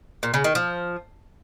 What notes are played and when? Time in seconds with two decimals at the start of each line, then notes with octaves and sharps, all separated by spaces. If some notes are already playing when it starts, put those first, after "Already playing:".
0.23 A#2
0.34 C#3
0.44 D#3
0.55 F3